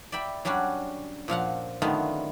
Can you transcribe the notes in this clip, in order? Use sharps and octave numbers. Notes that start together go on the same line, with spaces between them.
D5 E5 G5 B5
F#3 G3 C#4 D4 F#4
A#2 F3 F5 F#5
F#2 D3 D#3 A3 B3 F4